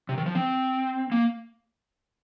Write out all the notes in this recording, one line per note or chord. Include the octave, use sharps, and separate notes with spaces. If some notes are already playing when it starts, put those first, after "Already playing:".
C3
D#3
F3
C4
A#3